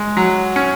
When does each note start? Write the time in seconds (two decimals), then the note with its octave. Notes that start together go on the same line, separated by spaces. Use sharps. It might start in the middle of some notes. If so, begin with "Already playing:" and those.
Already playing: G#3
0.17 F#3
0.56 C#4